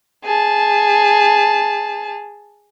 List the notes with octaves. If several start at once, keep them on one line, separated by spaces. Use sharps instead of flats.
G#4 A5